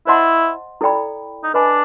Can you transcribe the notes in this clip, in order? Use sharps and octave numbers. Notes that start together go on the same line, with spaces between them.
E4 C5 D#5 F#5 A5 C6
E4 A4 D5 G5 B5
D#4
D4 B4 D#5 G#5 B5